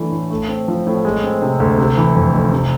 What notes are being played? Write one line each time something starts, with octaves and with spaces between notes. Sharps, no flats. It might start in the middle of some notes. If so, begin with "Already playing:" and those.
Already playing: E3 A3 D4
A2
A3
C4
F3
A2
G#3
C4
C3
D2
C3
E3
F2
F1
C3